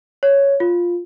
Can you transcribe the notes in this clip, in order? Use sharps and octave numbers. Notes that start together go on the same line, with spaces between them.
C#5
F4